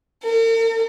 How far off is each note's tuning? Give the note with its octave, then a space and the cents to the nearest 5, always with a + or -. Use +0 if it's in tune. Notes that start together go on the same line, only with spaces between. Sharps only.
A#4 -45